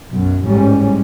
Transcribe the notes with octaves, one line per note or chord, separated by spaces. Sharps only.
B1 F#2
A1 G#2 G3 C#4